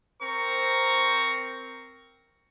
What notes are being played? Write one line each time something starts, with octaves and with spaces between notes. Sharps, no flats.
C4 A#4 C5 A#5 C#6